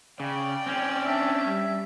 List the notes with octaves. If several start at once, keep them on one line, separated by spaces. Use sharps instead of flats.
C#3 D5 G5
C4 C#4
D4 E5
G3